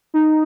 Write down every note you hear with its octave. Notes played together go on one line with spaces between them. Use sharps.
D#4